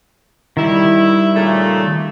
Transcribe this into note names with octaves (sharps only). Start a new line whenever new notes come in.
D#3 G3 E4
A#2 C#3 A3